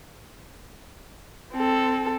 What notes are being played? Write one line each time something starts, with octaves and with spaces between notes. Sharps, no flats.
C4 A4